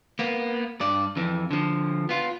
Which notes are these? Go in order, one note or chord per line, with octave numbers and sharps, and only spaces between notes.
A#3 B3
G2 D5
F2 E3
D3 F3
B3 F4